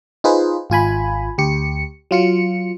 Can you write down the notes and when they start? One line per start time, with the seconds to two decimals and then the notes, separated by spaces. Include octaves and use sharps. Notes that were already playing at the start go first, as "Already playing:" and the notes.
0.24 D#4 F4 G#4 B4 C5
0.70 G#1 F4 G#5 B5
1.38 D2 G4 C#7
2.11 F#3 F4 C#7